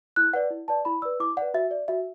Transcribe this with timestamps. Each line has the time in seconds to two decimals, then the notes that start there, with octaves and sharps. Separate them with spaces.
0.16 E4 F#6
0.33 B4 D5 F#5
0.51 E4
0.68 B4 D5 A5
0.85 E4 B5
1.02 B4 D5 E6
1.20 E4 D6
1.37 D5 F#5
1.42 B4
1.54 F#4 E5
1.71 D5
1.88 F#4 E5